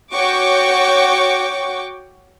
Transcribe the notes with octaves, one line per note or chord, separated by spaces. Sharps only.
F#4 C#5 G5 C#6 D6